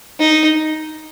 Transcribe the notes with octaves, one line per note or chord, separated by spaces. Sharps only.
D#4